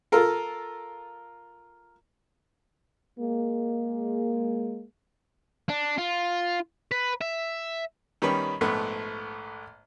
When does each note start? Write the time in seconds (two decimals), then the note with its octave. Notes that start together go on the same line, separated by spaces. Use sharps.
0.12 F4 A4 A#4
3.19 G#3 A#3
5.69 D4
5.98 F4
6.91 B4
7.21 E5
8.22 D#3 G3 B3 C#4 B4
8.61 A#1 G#2 A3 B3